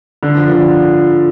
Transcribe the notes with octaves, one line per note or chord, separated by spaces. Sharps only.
D3
F3
D3